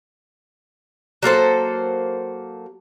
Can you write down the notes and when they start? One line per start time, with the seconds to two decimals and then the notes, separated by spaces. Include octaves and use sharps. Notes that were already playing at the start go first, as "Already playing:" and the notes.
1.23 F#3 A#3 A4 C5